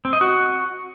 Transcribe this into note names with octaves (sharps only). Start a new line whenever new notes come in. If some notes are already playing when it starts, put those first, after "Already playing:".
C4
D#5
F#4